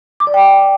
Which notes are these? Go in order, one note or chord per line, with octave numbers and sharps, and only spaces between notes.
D6
D5
G5